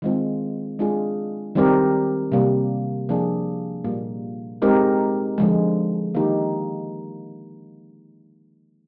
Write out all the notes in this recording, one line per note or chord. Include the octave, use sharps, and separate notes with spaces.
D#3 G#3 C4 F4
G#3 D4 F4 G#4
D#3 G3 C4 G4 A#4
C3 G3 A#3
F3 A#3 D4 G#4
A#2 G3 A#3
G#3 C4 D#4 G4 A#4
D3 F3 G#3
D#3 A#3 D#4 G4